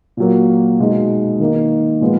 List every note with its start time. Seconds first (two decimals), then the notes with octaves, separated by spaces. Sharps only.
0.17 A#2 F#3 A#3
0.79 B2 G#3 D#4
1.40 D#3 A#3 D#4
2.01 A#2 F3 G#3 B3